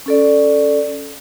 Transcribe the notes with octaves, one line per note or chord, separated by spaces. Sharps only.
C#4 A4 D5